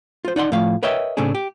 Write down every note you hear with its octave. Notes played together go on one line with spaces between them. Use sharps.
F4 C5
D#4 D5 F#5 C6
A2 F3 A3 F5
A#4 B4 C#5 D#5 E5 G5
A2 C#3 A3 C4 D4 G#4
G4